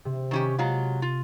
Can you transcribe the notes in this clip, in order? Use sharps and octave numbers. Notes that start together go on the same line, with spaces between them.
C3
D#3 C#4 G4
F#3 G#3 F4
F4